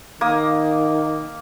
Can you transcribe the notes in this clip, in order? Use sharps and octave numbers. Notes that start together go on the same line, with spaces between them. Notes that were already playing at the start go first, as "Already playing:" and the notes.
D#3 A#3 D#6